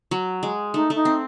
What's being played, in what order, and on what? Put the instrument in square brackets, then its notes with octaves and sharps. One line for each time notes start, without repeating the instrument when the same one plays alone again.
[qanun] F#3
G#3
[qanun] A3 [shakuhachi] D#4
[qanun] A3 [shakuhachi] D#4
[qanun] C4